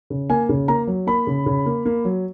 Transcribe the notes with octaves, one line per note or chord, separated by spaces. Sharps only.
C#3
A#3 G#5
C#3
A#3 A#5
F#3
A#3 B5
C#3
C#3
A#3
A#3
F#3